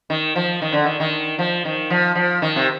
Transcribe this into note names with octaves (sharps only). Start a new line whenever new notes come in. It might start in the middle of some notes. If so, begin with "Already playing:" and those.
D#3
F3
D#3
D3
D#3
D#3
F3
D#3
F3
F3
D#3
C3